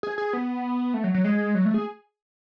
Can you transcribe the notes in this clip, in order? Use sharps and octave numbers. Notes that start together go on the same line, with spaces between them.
G#4
G#4
B3
A3
F#3
F#3
G#3
F#3
A3
G#4